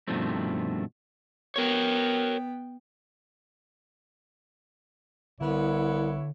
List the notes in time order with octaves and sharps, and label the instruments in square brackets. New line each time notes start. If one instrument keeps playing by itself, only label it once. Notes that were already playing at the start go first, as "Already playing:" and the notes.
[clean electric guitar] G2 B2 D#3 F3 A3 C4
[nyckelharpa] B3 G5 [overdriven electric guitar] A#4 C#5
[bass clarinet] C2 [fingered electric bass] D3 [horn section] B3 E4 C#5